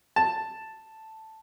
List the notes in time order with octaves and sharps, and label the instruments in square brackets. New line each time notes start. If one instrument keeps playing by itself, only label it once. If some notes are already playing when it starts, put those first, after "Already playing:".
[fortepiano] A5